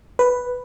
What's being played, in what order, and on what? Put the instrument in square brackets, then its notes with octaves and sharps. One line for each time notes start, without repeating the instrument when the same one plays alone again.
[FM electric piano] B4